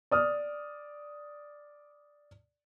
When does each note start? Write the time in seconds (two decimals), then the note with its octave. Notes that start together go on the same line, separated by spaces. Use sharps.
0.11 D5 D#6 F6